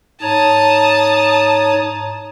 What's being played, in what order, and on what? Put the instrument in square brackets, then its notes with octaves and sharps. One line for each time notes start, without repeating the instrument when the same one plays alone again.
[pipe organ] G#2 C#5 A#5 [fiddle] A5 D#6